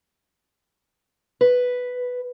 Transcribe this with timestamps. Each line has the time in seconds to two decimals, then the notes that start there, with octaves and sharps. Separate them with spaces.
1.41 B4